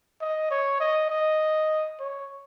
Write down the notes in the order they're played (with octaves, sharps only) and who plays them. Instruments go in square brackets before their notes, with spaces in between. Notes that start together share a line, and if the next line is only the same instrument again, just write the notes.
[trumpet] D#5
C#5
D#5
D#5
C#5